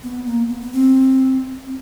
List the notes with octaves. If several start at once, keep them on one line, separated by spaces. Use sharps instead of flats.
B3
A#3
B3
B3
C4
C4